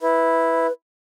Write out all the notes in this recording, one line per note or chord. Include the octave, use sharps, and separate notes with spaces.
E4 B4